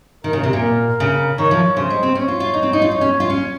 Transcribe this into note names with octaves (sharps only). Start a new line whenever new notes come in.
D#3 A#4
C#3
C3
A#2
A#4
C#3
D#3 C#5
F3
C#3 C5
G#3
C4
C#4 C#5
F4
F4
D#4
C4
D#4
F4
D#4 C#5
C#4
F4
C#4